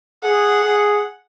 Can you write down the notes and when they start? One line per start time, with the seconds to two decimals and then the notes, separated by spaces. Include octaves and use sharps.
0.23 G#4 F#5
0.64 G#4